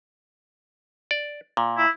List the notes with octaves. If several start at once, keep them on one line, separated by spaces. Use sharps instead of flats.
D5
A#2
E4